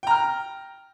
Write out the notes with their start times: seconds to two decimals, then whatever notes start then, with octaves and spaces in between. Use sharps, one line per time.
0.03 G5
0.07 A#5
0.11 F6